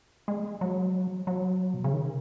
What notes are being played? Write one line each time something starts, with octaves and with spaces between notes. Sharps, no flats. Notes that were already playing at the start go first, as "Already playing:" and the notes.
G#3
F#3
F#3
B2
C#3
D#3